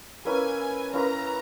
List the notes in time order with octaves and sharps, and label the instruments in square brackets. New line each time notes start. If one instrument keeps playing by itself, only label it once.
[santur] A#3 C#4 E4 B4 [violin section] G#5
[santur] A#3 C#4 E4 B4 [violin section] A#5